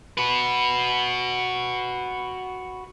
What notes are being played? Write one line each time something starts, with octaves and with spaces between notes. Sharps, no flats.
F#4 B4